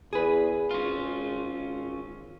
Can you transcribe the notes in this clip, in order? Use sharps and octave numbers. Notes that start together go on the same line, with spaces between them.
E2 G#4 B4
G#1 C#4 F4